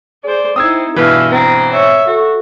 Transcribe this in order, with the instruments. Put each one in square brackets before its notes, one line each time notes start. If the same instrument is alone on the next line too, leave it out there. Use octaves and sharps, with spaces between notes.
[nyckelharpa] G#4 C5 [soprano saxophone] D5
[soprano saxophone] C4 [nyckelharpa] D#4 E4 [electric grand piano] D#6 E6 G#6
[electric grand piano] G2 B2 E3 [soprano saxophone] B4 [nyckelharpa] E5 F5
[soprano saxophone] C4 [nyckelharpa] A#5
[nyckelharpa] C#5 E5
[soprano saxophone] F#4 [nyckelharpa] A4